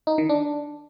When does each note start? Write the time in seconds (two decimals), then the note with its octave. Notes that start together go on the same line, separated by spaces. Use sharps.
0.07 D#4
0.18 D#3
0.29 D4